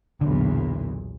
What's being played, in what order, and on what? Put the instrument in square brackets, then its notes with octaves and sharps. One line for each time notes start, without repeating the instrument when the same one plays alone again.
[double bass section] B1 E2 A#2 [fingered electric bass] D3